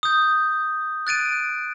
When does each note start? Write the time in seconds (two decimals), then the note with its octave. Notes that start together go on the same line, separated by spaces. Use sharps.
0.03 D#6 G6
1.07 F#6 A6 D7 D#7